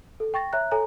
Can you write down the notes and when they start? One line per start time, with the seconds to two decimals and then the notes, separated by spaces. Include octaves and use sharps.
0.20 A4
0.34 G5 C#6 A6 A#6
0.53 C#5 E5 A#5 F#6
0.72 A4 C#5 G#5 A#5